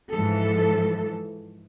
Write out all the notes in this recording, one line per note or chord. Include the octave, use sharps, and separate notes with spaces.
G#2 E3 F3 A4